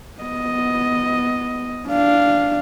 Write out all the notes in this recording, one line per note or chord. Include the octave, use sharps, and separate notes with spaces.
B3 D#5
D4 F5